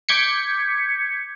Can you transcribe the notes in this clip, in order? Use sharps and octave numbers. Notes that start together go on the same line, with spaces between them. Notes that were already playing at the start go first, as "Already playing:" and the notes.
D6 G6 G#6 B6 C#7